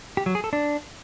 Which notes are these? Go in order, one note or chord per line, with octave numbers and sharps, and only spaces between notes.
G4
F#3
G#4
A4
D4